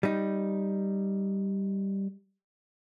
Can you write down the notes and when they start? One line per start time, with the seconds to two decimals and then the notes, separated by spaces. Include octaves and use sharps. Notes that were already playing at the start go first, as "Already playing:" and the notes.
0.03 G3 D#4